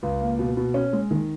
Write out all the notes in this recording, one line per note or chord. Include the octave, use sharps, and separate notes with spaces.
C#2
A#3
B2
B2
C#4
G#3
D#3